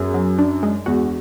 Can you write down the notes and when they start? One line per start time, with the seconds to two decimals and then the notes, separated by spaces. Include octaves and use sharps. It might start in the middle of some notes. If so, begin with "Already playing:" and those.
Already playing: F#2 B3 G#4
0.14 F#3
0.38 D4
0.63 G#3
0.86 E2 F#4